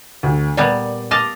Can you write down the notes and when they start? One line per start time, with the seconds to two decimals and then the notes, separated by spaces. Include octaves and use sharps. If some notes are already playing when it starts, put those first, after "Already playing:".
0.23 D2
0.57 A#2 G3 B3 D5
1.11 D#5 F5 A5 D6